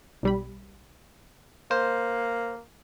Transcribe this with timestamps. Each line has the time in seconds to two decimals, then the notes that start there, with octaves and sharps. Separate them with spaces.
0.23 B1 G3 B5
1.71 A#3 C5